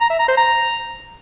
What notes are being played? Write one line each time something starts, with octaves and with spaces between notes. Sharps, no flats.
A#5
E5
A#5
C5
A#5